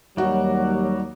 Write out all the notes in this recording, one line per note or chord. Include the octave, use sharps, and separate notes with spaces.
D#2 F#3 G3 D#4 F#4